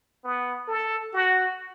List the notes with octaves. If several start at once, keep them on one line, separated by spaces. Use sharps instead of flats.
B3
A4
F#4